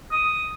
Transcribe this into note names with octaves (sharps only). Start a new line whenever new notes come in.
D#6